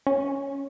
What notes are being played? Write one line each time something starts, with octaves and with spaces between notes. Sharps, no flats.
C#4